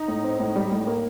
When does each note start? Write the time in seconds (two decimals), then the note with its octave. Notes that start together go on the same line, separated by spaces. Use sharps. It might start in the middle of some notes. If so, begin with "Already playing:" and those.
Already playing: D#4
0.08 A2
0.24 C4
0.40 A2
0.56 G3
0.71 A2
0.87 A#3